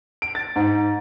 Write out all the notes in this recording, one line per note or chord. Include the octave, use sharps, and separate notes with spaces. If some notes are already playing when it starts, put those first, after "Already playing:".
D7
A6
G#2